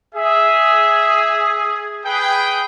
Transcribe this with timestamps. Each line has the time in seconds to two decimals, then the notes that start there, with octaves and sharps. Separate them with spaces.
0.15 G#4 E5
2.05 G#4 B4 G5